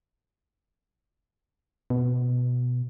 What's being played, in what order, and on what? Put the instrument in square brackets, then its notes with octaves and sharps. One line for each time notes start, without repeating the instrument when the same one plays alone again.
[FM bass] B2